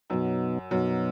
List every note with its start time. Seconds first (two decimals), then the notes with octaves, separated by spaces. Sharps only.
0.10 F#2 B2 F#3 B3 D#4
0.71 F#2 B2 F#3 B3 D#4